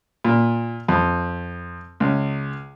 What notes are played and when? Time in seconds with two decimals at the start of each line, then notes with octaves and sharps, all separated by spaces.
0.25 A#2
0.88 F2
2.00 C#2